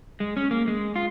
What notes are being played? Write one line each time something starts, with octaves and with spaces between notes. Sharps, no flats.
G#3
C#4
A#3
G#3
F4